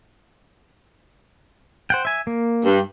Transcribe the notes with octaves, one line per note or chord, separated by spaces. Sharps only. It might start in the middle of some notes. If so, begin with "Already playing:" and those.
C5 F#5 G5
E5 G#5
A#3
G2